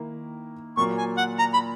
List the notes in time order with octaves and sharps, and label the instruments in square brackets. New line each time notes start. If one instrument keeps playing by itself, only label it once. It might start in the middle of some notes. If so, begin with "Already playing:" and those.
Already playing: [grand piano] D#3 A#3 E4 A#4
[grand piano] A#2 F#3 A#3 [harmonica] C#6
[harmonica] G#5
F#5
A#5
B5